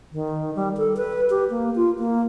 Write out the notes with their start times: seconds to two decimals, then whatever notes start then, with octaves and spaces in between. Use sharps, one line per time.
0.13 D#3
0.56 G3
0.77 A4
0.97 B4
1.30 G4
1.50 A#3
1.76 F4
1.99 A#3